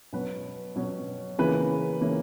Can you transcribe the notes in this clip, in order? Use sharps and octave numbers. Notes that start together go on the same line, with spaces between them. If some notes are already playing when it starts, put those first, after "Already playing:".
B2 F#3 C#4 B4
B2 F#3 C#4
C#3 E3 A#3 C#4 B4
C#3 E3 A#3 C#4